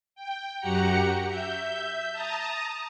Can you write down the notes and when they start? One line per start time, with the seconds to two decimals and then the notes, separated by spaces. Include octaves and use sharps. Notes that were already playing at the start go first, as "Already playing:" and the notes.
0.15 G5
0.60 F#2 F#4 G4 F#5 A#5 C#7
1.26 E5 G6
2.12 A5 A#5 D#6